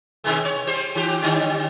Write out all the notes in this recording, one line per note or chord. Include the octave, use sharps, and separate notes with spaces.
B2 D#3 G#3
C#5
G3 C5
D#3 G4
D3 G3 C#4